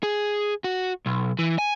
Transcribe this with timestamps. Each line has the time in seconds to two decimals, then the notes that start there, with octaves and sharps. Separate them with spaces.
0.03 G#4
0.64 F#4
1.06 B1
1.39 E3
1.58 G#5